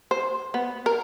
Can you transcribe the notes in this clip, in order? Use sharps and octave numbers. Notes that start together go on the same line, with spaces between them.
C5
B3
A#4